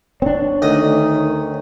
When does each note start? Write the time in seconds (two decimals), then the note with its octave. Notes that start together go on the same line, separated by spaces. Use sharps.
0.22 C4 D4 C#5
0.62 D2 D#3 D#5 D#6